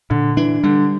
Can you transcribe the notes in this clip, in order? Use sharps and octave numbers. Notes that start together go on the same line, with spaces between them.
A#2 D3
E3 D4
D3 G3